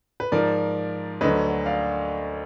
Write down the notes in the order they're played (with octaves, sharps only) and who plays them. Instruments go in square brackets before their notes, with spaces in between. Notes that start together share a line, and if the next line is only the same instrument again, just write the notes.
[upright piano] B4
G#2 F3 A#4 D5
D2 D3 F#3 B4 D#5
D5 F5